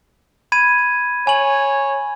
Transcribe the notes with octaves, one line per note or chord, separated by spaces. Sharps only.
B5 G#6 D#7
C#5 G#5 F#7